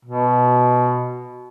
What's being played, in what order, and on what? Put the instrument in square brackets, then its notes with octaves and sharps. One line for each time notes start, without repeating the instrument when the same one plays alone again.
[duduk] B2